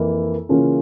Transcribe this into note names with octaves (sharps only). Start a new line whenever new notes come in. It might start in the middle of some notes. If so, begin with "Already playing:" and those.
Already playing: F2 E3 A#3 E4
C#3 E3 A#3 C#4 F4